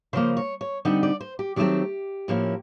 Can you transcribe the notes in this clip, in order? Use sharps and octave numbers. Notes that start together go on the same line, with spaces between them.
C#3 F3 A#3 C5
C#5
C#5
D3 G3 C4 D#4 F#5
D5
C5
G4
D#3 F#3 A3 C4 G4
A2 F3 A#3 C#4 E4